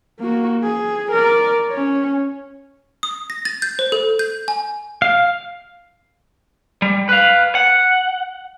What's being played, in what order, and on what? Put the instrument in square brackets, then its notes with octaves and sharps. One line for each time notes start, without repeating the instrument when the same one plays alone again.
[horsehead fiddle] A#3 F#4
G#4
A#4 D5
C#4 C#5
[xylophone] D#6
A#6
A6
G6
C5
A4
G6
G#5
[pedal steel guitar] F5
[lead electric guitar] G3
B4 F5
F#5